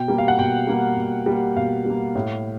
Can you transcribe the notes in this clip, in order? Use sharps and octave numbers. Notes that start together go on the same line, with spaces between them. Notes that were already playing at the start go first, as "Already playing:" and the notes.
Already playing: B2 G5
G3 A#3
F5
F#5
B2 G5
G3 A#3
B2
G3 A#3
B2 F5
G3
A#3
A2